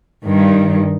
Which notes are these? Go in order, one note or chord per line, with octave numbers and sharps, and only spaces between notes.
G2 D#3